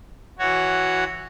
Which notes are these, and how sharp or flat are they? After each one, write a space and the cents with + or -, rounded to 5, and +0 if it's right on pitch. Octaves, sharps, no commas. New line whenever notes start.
E3 +0 F#4 +0 C#5 +0